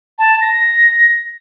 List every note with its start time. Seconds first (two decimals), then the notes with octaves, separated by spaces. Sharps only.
0.19 A5
0.41 A#6